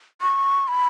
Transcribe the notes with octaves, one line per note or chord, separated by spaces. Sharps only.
C#6
B5